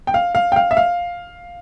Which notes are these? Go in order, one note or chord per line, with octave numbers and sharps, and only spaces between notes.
G5
F5
F5
G5
F5
E5
F5